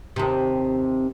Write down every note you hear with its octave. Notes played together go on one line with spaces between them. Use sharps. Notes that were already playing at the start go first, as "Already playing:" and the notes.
D#2 C3